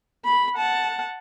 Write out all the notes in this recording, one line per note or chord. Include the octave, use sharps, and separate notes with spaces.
B5
F#5 A5